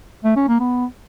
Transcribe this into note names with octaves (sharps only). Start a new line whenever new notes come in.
A3
C#4
A#3
B3